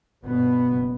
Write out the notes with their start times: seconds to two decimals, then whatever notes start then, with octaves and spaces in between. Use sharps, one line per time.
0.24 G1 G2 B2 B3
0.67 F#1